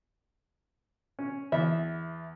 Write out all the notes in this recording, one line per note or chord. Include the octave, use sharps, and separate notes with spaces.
C#4
E2 E5